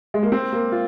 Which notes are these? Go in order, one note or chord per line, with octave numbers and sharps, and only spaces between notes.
G#3
A#3
C4
A#3
F4